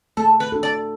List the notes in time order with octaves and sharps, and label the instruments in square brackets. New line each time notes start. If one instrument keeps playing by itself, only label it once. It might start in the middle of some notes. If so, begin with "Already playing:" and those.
[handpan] A3 [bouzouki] A4
[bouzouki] B4
[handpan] D4 F#4 A4
[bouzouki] D5